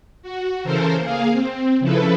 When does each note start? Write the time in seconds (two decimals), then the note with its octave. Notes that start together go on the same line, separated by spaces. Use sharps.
0.22 F#4
0.63 C#3 E3 A4 A#4 C5
0.99 A#3 G#4 F5
1.32 C4
1.80 C#3 F3 E4 A4 B4